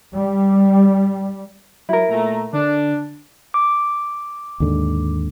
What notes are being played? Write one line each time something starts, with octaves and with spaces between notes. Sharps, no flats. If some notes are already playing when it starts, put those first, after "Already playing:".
G3
F#3 E4 A#4
A#2 A3 A#5
D3 D4
D6
D#2 G#2 D3